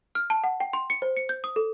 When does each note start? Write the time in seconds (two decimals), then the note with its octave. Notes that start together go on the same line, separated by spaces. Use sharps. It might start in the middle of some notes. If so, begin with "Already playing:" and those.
0.15 F6
0.30 A5
0.44 F#5
0.60 G5
0.73 C6
0.90 C#7
1.02 C5
1.17 C#7
1.29 G6
1.44 D#6
1.56 A4